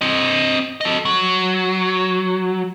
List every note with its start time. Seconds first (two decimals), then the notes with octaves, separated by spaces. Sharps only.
0.01 C4 D#5
0.81 A4 D#5
1.05 F#3